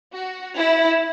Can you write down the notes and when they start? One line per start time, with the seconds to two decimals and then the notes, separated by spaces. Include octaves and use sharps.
0.12 F#4
0.56 E4